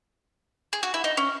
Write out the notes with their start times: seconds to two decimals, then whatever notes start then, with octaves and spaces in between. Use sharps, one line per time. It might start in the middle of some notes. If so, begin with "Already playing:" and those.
0.73 G#4
0.83 F#4
0.94 E4
1.04 D#4
1.17 C#4